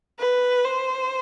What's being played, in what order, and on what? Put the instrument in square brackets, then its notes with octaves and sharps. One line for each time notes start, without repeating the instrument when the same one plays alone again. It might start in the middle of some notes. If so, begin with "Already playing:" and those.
[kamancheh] B4
C5